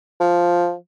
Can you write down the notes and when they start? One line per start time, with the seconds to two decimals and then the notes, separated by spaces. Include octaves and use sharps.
0.20 F3